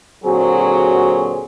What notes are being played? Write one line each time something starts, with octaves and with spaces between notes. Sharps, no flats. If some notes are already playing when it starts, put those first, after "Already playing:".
A#2 D3 F#3 C4 F#4 G#4